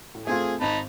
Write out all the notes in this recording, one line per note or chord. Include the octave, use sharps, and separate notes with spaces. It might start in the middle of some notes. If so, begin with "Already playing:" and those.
A2
A3 C4 F4 G#4 G#5
G#1 D#4 A5 B5 F7